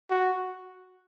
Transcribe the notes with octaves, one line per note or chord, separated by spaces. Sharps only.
F#4